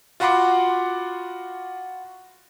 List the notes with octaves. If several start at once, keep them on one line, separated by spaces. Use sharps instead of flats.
F4 F#4 F#5 B5 C6 D6